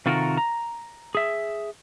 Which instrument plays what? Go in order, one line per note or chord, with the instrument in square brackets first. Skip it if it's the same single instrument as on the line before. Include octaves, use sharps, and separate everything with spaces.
[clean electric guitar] C3 D#3 F4 F#4 A4 A#4
A#5
G#4 E5